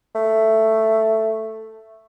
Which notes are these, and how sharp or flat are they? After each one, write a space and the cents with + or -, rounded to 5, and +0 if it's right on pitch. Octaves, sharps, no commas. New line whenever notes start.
A3 +5